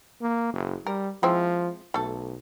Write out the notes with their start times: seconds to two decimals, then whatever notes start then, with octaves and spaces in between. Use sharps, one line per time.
0.22 A#3
0.54 F#1
0.87 G3 A#4
1.23 F3 G#3 C4 E4
1.94 B1 A3 A4